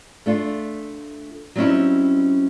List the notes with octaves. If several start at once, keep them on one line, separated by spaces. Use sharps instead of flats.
A3 D4 F4
F#3 G3 C4 C#4 D#4 E4